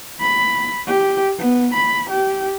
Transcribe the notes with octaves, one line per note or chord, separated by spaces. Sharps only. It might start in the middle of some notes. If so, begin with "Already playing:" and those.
B5
G4
B3
B5
G4